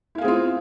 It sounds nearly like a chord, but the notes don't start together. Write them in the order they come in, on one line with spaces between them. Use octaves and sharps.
E4 F5 G#4 C4 F4